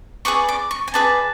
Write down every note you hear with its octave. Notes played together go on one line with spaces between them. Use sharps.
G#4 B4 D5 C#6
D6
C#6
G#5
G#4 B4 D5 A5